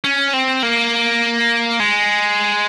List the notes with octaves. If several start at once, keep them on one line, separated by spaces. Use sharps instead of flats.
C#4
C4
A#3
G#3